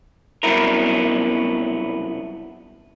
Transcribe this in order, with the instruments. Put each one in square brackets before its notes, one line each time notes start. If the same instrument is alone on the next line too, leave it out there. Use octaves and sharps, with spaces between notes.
[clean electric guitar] C2 F#2 B2 B3 E4 A#4